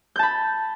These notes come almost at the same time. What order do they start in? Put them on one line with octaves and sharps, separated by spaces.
G6 A5 B5